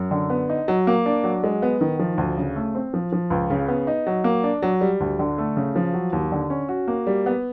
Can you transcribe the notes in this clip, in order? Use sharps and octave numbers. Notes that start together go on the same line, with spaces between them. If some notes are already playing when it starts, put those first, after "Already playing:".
Already playing: F#2
D3
B3
D#4
F#3
A#3
D4
F#3
G#3
B3
D#3
F3
D2
C#3
A3
C4
F3
F3
C#2
C#3
B3
D#4
F#3
A#3
D4
F#3
G3
D2
D3
A3
C#3
F3
F#3
D#2
D3
C#4
F#4
A#3
G3
B3